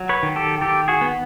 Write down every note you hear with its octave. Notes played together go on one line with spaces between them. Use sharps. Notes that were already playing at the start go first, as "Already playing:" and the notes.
Already playing: F#3
B4 C#5
D#3
G4 A4
D#3 G4 A4
F#4 G#4
B3